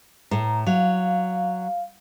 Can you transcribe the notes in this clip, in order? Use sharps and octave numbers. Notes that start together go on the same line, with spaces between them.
A2 A3 A#5
F#3 F5